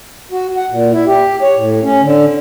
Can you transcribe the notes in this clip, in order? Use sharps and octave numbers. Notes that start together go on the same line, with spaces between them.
F#4
F#5
A#2
E4
G4
C#5
A2
C#4
D3